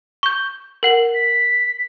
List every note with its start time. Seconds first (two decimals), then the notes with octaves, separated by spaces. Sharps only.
0.23 C#6 G6
0.83 A#4 F#5 F#7
1.14 B6